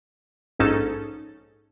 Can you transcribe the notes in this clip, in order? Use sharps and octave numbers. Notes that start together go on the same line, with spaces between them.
A#1 G#2 C#4 D#4 A4